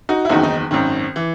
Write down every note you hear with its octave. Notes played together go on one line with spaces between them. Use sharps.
D#4 F#4
E4
F#1 E2 D#3 D#4 F#4
D#4
G#1 F#2 D#3
E3